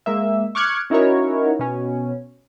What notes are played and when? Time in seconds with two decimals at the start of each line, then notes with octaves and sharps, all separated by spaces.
0.06 G#3 A#3 E5
0.55 C#6 D6 F6 F#6 G#6 C#7
0.90 C#4 D#4 E4 F#4 A#4 C#5
1.59 B2 C#4